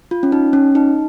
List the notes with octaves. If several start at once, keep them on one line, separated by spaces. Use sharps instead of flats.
F4
C#4
D#4
C#4
D#4